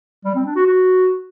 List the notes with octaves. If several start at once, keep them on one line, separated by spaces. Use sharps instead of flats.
G3
C4
D4
F#4
F#4